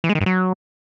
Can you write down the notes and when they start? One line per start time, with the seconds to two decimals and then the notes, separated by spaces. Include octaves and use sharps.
0.04 E3
0.09 G#3
0.15 D#3
0.21 G2
0.26 F#3